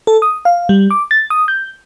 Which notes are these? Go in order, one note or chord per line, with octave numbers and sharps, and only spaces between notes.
A4
D#6
F5
G3
D6
A6
D#6
G6